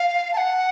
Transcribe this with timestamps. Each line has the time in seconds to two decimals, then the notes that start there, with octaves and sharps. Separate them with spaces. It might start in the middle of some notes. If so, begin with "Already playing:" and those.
Already playing: F5
0.34 A5
0.37 F#5